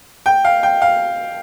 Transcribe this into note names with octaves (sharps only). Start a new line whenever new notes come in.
G5
F5
G5
F5